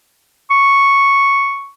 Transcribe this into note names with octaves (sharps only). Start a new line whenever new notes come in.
C#6